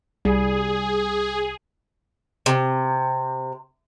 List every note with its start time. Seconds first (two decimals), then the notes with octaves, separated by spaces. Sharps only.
0.25 C2 G3 G#4
2.46 C3